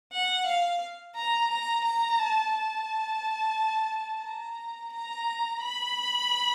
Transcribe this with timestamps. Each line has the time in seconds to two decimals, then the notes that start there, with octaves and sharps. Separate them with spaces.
0.12 F#5
0.46 F5
1.16 A#5
1.50 A#5
1.85 A#5
2.19 A5
2.53 A5
4.25 A#5
4.93 A#5
5.62 B5